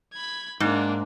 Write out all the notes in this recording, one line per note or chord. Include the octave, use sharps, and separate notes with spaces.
B5 G#6
G#2 A#3 D4